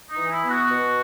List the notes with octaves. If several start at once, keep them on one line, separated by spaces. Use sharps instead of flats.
D#4
E3
E4
B3
F#4
B2